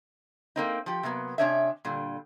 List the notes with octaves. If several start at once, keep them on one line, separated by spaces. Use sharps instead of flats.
A#3 C4 D#4
F3 G4
C3 F#3 A#3 B3
C3 C#4 D4 C#5 D#5 E5
A#2 D3 G3